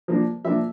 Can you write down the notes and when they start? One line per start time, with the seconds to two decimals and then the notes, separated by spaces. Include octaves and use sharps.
0.08 F3 A#3 D4
0.45 F3 A#3 D4 E5